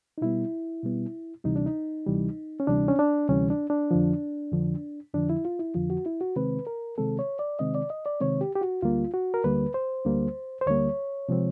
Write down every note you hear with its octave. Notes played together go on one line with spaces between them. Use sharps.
D#4
B2 G3 B3 E4
B2 G3 B3
D2 C3 E3 G3 D#4
D4
D#4
D2 C3 E3 G3
C#4
D2 C3 E3 G3 D4
C#4
D4
D2 C3 E3 G3 C#4
D4
D4
F2 D3 F3
F2 D3 F3
F2 D3 F3 D4
E4
F4
E4
F2 D3 F3 F4
F#4
E4
F#4
C3 D#3 G#3 C4 B4
A#4
C3 D#3 G#3 C4 A4
C#5
D5
C3 D#3 G#3 C4 D#5
D5
D#5
D5
C3 D#3 G#3 C4 C#5
G4
G4
F#4
D2 D3 G3 A#3 F4
F#4
A#4
D2 D3 G3 A#3 B4
C5
D2 D3 G3 A#3
C5
D2 D3 G3 A#3 C#5
C3 F3 G#3 C4